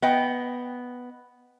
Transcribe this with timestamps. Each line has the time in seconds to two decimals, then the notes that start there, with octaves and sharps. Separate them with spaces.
0.02 B3 D#5 G5